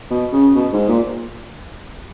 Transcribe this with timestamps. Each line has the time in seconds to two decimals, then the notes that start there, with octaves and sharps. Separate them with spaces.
0.10 B2
0.32 C#3
0.55 B2
0.72 G#2
0.88 A#2